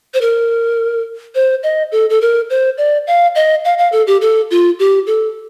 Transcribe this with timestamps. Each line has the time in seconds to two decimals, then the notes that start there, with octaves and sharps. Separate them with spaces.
0.14 C5
0.21 A#4
1.35 C5
1.63 D#5
1.92 A4
2.10 A4
2.21 A#4
2.50 C5
2.78 D5
3.07 F5
3.35 D#5
3.65 F5
3.78 F5
3.92 A4
4.07 G4
4.21 A4
4.51 F4
4.79 G4
5.07 A4